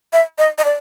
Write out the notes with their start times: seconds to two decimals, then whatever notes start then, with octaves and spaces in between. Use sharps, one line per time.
0.13 E5
0.38 D#5
0.58 D#5
0.64 D5